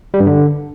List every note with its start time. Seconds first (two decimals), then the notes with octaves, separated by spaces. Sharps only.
0.14 G3
0.20 G2
0.27 D3